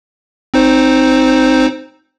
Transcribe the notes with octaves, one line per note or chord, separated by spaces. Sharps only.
C4 D#4 C5